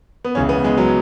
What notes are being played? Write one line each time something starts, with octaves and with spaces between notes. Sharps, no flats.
B3
C#2 C#3 E3 C#4
B3
G#3
F#3